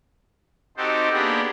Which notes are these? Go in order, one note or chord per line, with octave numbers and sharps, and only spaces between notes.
C4 D#4 F#4 G4 A4 C5
A#3 B3 D4 G4 G#4 B4